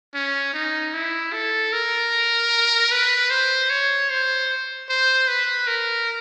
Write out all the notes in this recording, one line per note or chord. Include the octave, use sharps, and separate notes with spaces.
C#4
D#4
E4
A4
A#4
B4
C5
C#5
C5
C5
B4
A#4